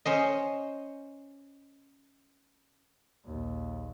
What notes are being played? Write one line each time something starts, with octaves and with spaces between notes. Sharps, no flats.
C#4 C5 D#5
A#1 D#2